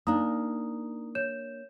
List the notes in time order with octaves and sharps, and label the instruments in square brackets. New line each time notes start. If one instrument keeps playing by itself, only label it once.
[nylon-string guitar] A#3 D4 [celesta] D#4 A#5 D#6
[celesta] C#5 G6 E7